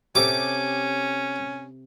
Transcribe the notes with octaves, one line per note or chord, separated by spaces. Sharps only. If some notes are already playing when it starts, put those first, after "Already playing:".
C3 C#4 G4 A4 D6